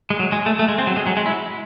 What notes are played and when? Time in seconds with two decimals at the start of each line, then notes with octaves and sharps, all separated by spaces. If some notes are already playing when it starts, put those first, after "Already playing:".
0.10 G#3
0.19 F#3
0.32 G#3
0.46 A3
0.59 A3
0.68 G#3
0.78 C4
0.87 F#3
0.97 G#3
1.07 F#3
1.17 G#3
1.26 E4